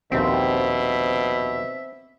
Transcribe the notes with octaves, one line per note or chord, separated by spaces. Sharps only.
A#1 D#2 B2 C4 E5